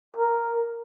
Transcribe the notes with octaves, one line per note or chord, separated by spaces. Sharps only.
A#4